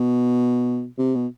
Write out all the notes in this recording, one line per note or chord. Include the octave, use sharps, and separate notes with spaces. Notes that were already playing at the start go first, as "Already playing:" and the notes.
Already playing: B2
C3
B2